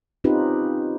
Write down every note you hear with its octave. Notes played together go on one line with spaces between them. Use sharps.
C4 C#4 D#4 F4 G4 B4